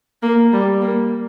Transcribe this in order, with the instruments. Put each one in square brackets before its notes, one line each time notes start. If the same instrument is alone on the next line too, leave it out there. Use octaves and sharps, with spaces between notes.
[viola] A#3
G3
A#3